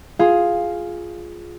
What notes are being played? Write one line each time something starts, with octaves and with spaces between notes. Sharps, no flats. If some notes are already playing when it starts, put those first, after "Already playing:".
F4 G#4 F5